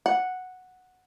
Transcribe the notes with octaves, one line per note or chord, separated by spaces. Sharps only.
F#5